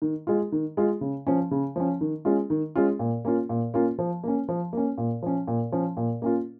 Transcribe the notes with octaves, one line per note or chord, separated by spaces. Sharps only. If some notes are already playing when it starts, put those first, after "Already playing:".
D#3
G#3 F4
D#3
G#3 F4
C#3
F3 C#4
C#3
F3 C#4
D#3
G#3 C#4 F4
D#3
G#3 C#4 F4
A#2
A#3 C#4 F4
A#2
A#3 C#4 F4
F3
A#3 C#4
F3
A#3 C#4
A#2
F3 C#4
A#2
F3 C#4
A#2
A#3 C#4 F4